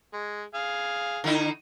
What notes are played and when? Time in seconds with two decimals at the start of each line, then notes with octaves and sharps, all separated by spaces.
0.13 G#3
0.55 G#4 F5
1.24 D3 D#4 E4